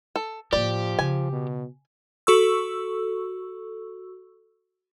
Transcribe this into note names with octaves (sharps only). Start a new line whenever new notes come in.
A4
A2 F3 A#3 G4 D5
C#3 G#5
B2
F#4 A4 C#6 E6